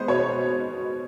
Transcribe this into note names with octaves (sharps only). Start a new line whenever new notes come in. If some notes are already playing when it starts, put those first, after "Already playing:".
Already playing: G#3 B3 C5
B2 C#5